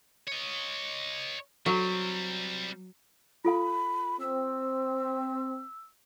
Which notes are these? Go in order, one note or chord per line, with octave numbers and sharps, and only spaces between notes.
C#5 D#5
F#3 G3 C4
F4 A4 F5 B5
C4 E6